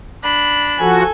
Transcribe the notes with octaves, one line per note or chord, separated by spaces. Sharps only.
D4 B5
F3 F#4 A4 G#5